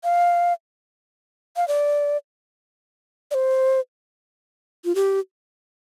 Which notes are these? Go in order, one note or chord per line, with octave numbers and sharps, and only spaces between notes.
F5
F5
D5
D5
C5
F4
G4